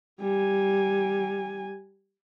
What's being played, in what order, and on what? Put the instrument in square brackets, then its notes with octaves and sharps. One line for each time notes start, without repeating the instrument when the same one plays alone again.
[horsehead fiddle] G3 G#5